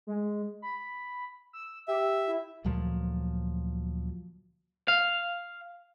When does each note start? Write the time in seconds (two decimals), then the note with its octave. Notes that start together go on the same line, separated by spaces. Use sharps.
0.07 G#3
0.62 B5
1.53 E6
1.88 G4 E5
2.28 E4
2.65 D2 A#2 F3 F#3
4.88 F5